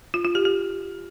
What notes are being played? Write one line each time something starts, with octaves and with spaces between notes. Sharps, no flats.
F4
F4
G4
G4